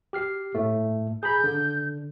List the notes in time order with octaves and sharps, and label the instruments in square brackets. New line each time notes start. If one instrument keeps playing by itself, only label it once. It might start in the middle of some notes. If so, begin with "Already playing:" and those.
[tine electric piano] G4 F6 C7
A2 A3
[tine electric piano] G#4 A#5 B5 [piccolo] G6
[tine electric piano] D3